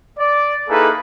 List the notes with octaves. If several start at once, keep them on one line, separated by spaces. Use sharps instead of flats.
D5
A#3 D#4 E4 G#4 A4 B4